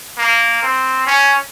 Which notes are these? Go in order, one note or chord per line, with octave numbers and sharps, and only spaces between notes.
A#3
C4
C#4